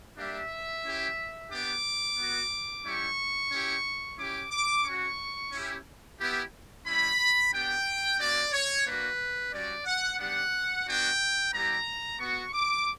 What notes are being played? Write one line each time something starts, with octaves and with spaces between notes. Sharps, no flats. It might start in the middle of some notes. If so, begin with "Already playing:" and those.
G3 A#3 D4 G4 E5
C#4 E4 G4
B3 D4 G4 D6
B3 F#4
G3 C#4 E4 G4 C#6
C#4 E4 G4
C#4 E4 G4 D6
D6
C#4 F#4 C#6
C#4 E4 G4
B3 E4 G4
G3 C#4 E4 B5
B3 D4 G4 G5
A#3 C#4 F#4 D5
C#5
A#3 D4 F#4 B4
G3 C#4 F#4 D5
F#5
G3 B3 D4 G4 F#5
B3 D4 F#4 G5
G3 B3 E4 G4 A#5
B3 F#4 C#6
D6